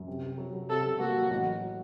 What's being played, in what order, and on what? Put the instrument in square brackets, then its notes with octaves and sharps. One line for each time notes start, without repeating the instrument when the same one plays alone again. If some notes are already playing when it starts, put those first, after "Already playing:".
Already playing: [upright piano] F#2
C3
C3
F#3
F#3
[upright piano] C3 [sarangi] A4
[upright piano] C3
[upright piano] A#3 [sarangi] F#4
[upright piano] F#3
A1
F#3